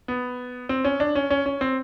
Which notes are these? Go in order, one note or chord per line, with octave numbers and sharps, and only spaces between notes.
B3
C4
C#4
D4
C#4
C#4
C#4
C4